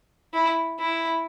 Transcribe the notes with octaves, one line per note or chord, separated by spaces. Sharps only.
E4
E4